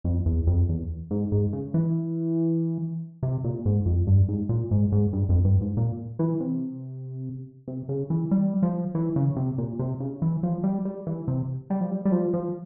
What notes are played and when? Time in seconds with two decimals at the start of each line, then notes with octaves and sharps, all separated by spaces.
0.04 F2
0.26 E2
0.47 F2
0.69 E2
1.11 G#2
1.32 G#2
1.53 C#3
1.74 E3
3.23 C3
3.44 A#2
3.65 G#2
3.86 F2
4.07 G2
4.28 G#2
4.49 A#2
4.71 G#2
4.92 G#2
5.13 G2
5.29 F2
5.45 G2
5.61 G#2
5.77 A#2
6.19 E3
6.40 C3
7.68 C3
7.89 C#3
8.10 E3
8.31 G3
8.63 F3
8.95 E3
9.16 C#3
9.36 C3
9.58 A#2
9.79 C3
10.00 C#3
10.22 E3
10.43 F3
10.63 G3
10.85 G3
11.07 E3
11.28 C3
11.70 G3
11.81 F3
11.91 G3
12.05 G3
12.12 F3
12.34 F3